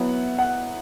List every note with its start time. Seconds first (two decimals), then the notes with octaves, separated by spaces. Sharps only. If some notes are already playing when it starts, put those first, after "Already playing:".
Already playing: F#3 B3 E4 F#5
0.39 F#5